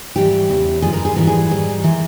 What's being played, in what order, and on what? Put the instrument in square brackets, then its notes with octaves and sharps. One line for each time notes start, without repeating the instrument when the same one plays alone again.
[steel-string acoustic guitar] G#2 E3 G3 G4
E2 C#3 E3
G2 F3 G#3 G#4
A#4
G#4
G#2 E3 G3 A#4
G#4
G#2 G3
E3 G#3 A#4